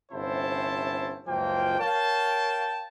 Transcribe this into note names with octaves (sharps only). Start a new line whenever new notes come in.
G1 C3 C#4 E4 C5 A5
F#1 C#2 F3 A#3 G5
A#4 C#5 F5 G5 A5